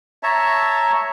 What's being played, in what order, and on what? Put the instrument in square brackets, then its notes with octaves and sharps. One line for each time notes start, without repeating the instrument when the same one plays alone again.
[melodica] C#5 E5 A5 A#5